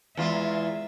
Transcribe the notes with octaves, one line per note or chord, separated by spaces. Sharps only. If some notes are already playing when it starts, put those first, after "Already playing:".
E2 G#3 F4 E5